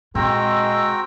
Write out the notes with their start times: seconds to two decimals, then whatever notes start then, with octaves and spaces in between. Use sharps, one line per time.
0.15 A#2 G#3 C4 F#4 G5 A#5